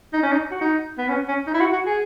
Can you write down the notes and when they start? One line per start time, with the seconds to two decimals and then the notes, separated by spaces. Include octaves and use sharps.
0.13 D#4
0.23 C#4
0.32 D#4
0.51 F#4
0.61 D#4
0.98 B3
1.09 C#4
1.28 C#4
1.47 D#4
1.54 E4
1.60 F#4
1.72 F#4
1.85 G#4